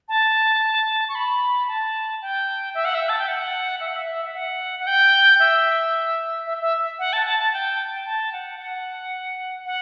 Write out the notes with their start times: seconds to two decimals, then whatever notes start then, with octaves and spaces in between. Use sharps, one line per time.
0.09 A5
1.09 C#6
1.15 B5
1.68 A5
2.22 G5
2.75 E5
2.85 F#5
2.94 E5
3.09 A5
3.19 G5
3.28 F#5
3.80 E5
3.88 F#5
3.96 E5
4.26 E5
4.34 F#5
4.80 F#5
4.87 G5
5.40 E5
6.46 E5
6.61 E5
6.99 F#5
7.13 A5
7.26 A5
7.40 A5
7.53 G5
8.06 A5
8.33 F#5
8.59 F#5
9.66 F#5